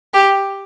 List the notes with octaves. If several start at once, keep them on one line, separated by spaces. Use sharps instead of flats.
G4